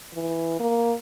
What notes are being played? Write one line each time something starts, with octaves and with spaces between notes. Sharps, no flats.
E3
A#3